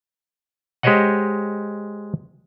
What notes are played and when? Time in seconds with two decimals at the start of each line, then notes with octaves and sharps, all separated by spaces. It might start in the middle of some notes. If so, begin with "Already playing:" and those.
0.83 G#3 G4 C5 C#5 D#5 F#5